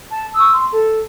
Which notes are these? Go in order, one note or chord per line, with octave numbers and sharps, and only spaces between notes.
A5
C#6 D#6 E6
C6
A4